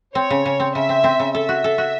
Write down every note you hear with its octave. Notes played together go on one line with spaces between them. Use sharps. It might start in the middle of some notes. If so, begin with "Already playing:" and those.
C4 C#5
C#3
C#3
C4
C#3 E5
C4
C4
C#3
A4 E5
F#4
A4
F#4